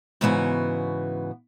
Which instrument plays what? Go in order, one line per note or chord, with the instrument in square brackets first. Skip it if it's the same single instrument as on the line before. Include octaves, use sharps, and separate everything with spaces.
[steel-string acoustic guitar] G#2 C#3 E3 B3 F#4